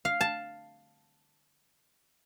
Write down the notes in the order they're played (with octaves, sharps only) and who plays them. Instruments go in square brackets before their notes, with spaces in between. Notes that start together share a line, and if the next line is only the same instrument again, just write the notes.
[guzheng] F5
A5